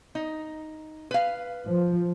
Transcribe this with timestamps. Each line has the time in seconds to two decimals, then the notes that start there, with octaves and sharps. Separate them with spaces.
0.15 D#4
1.11 B4 F5
1.66 F3